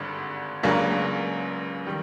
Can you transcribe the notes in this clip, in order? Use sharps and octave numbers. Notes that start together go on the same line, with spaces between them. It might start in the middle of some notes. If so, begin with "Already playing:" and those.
Already playing: G#1 G2 D3
C#2 C#3 F#3 A#3 D4
D#3 G3